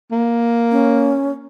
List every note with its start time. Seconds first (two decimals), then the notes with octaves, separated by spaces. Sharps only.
0.12 A#3
0.71 C#4